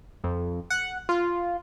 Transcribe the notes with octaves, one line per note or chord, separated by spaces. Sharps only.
F2
F#5
F4